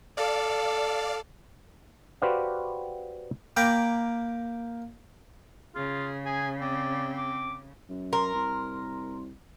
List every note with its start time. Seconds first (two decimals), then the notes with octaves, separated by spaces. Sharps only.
0.17 A4 D5 F5
2.22 F#4 G4 B4 C5 D5 F5
3.57 A#3 A#4 G5 A#5 B5 D6
5.75 C#3 F4 G#4
6.25 G#4 G#5
6.61 C4 D5
7.17 D6
7.89 F#2
8.13 A#4 C6
8.34 C2